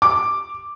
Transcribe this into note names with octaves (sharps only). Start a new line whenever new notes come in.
D6